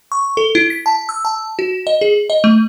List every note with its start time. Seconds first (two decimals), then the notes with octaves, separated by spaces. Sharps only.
0.12 C#6
0.37 A4
0.55 E4
0.70 B6
0.86 A5
1.09 E6
1.25 A5
1.59 F#4
1.87 D#5
2.01 G#4
2.30 D#5
2.44 A3